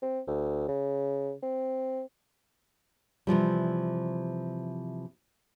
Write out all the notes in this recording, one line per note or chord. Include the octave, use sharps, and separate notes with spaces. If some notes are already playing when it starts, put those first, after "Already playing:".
C4
D2
C#3
C4
C3 E3 F3 G3